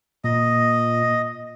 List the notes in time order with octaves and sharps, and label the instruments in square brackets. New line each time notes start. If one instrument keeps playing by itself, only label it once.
[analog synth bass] A#2 [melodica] D#5